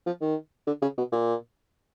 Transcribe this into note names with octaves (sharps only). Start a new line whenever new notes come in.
F3
D#3
D3
C#3
B2
A#2